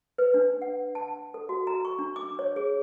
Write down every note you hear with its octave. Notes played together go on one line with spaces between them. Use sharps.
B4
D4
F#5
A5
A4
F#4
A#5
C#6
D4
D6
C#5
G#4